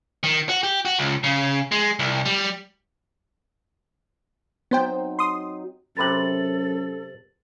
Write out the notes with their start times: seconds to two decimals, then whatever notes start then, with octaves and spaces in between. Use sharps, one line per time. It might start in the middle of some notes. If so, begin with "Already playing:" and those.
0.23 D#3
0.49 F#4
0.63 G4
0.85 F#4
0.99 C#2
1.24 C#3
1.72 G#3
1.99 C2
2.25 G3
4.71 F#3 B3 C4 D#4 C5 G5
5.19 C6 D#6
5.97 F#2 C3 A4 B4 A#5 A6 F#7